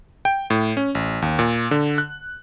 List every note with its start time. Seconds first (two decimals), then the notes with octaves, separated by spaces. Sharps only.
0.25 G5
0.50 A2
0.77 C#4
0.95 A1
1.22 D#2
1.39 A#2
1.71 D3
1.98 F#6